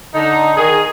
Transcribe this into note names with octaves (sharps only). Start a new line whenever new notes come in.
D3 D#4
D#3 G#4